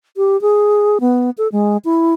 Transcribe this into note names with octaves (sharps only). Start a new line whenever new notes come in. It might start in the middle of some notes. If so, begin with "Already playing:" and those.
G4
G#4
B3
A4
G#3
E4